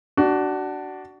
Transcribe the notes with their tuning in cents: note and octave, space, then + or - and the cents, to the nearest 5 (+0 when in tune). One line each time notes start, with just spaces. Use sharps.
D4 +0 F#4 +25